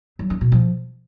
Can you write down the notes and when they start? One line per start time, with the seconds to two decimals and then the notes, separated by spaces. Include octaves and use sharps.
0.19 F#3
0.30 C#4
0.41 B2
0.52 F3